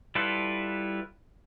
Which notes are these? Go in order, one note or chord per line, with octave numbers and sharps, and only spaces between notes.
G3 E4 F4 A4 B4